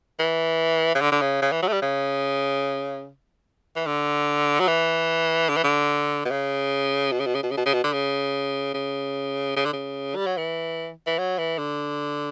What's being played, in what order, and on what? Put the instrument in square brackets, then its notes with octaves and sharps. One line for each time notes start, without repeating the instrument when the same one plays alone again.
[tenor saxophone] E3
C#3
D3
D3
C#3
C#3
E3
F#3
A3
G3
C#3
E3
D3
F#3
E3
D3
E3
D3
B2
C#3
B2
C#3
B2
C#3
B2
C#3
B2
C#3
B2
D3
C#3
C#3
C#3
D3
C#3
G3
F#3
E3
E3
F#3
E3
D3